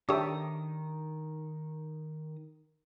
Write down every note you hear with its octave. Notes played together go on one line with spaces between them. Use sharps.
D#3 D4 G4 A4 C#5 E5 D#6